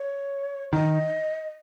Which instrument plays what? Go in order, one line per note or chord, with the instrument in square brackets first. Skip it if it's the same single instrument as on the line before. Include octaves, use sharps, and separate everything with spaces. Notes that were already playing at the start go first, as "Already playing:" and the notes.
Already playing: [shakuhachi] C#5
[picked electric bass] D#3 [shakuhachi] D#5